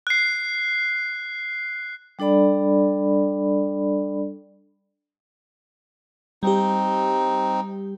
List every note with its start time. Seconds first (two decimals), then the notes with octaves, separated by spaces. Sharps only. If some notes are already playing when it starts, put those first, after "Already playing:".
0.07 F#6 C7
2.19 G3 D4 A4 D5 B5
6.43 G3 C4 D#4 G4